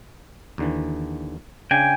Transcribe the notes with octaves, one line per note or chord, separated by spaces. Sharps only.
D#2 D3 E3
C#3 D4 G5 G#5